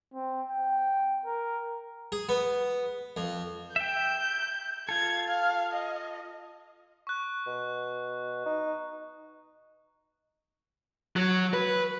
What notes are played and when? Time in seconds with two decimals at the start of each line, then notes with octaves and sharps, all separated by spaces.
0.14 C4
0.49 G5
1.26 A#4
2.12 G#4
2.29 B3
3.17 F2
3.76 E5 G5 G6
4.89 F4 A4 G#6
5.29 F5
5.72 D#5
7.07 C#6 F#6
7.47 B2
8.46 D#4
11.16 F#3
11.54 B4